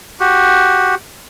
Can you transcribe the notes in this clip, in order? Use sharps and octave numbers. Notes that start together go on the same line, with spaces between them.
F#4 G4